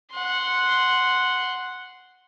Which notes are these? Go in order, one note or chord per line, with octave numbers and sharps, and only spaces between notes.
F#5 C6